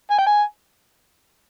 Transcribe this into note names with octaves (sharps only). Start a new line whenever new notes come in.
G#5
G5
G#5